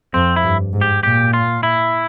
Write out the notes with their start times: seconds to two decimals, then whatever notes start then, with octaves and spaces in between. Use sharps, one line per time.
0.14 F2 C4
0.36 E4
0.43 G2
0.73 G#2
0.81 G4
1.03 A#2 G4
1.33 F4
1.63 E4